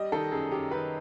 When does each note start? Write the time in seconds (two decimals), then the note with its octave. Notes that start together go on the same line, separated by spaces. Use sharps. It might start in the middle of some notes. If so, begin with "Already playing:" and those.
Already playing: G3 D#5
0.12 D#3 A4
0.32 F#2 G#4
0.51 F#2 G4
0.71 D#3 B4